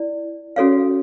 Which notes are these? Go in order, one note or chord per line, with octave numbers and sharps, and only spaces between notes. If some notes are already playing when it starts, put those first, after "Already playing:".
Already playing: E4 D5
C#4 F#4 A4 C#5 F5